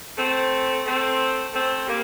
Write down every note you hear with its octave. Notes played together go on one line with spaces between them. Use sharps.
A3 C4
A3 C4
A3 C4
G3 A#3